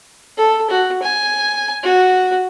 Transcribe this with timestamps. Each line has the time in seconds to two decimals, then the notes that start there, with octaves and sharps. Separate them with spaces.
0.38 A4
0.70 F#4
1.02 G#5
1.83 F#4